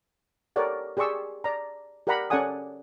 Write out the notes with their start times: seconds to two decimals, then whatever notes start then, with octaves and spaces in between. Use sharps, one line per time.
0.56 G4 A4 A#4 C#5 D5 F#5
0.97 G4 G#4 D5 C6 C#6 E6
1.44 D5 A#5
2.07 G4 A#4 D5 F#5 A#5 B5
2.30 C#4 A4 D5 F#5 G#5 D#6